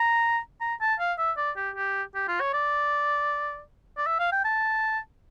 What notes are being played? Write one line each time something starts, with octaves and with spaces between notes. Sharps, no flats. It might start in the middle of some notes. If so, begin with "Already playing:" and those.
Already playing: A#5
A#5
A5
F5
E5
D5
G4
G4
G4
F4
C#5
D5
D5
E5
F5
G5
A5